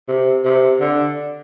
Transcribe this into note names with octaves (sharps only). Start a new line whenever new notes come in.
C3
C3
D3